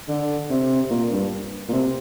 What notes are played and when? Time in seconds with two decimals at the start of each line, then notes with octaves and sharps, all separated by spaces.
0.08 D3
0.50 C3
0.90 A#2
1.11 G2
1.69 A#2
1.73 C3